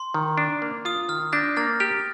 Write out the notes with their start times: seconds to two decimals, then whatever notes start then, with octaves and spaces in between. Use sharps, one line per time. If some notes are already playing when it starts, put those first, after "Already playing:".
Already playing: C6
0.14 D#3
0.38 D4
0.62 A#3
0.85 F4 D#6
1.09 D#3 F6
1.32 D4 G6 A#6
1.57 A#3 F6 A6
1.80 G4 F6